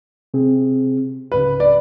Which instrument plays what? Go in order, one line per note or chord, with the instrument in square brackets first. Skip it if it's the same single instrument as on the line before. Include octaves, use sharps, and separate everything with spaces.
[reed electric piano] C3 C4 G#4
[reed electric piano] C#2 G#2 C#3 [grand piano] B4
[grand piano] D5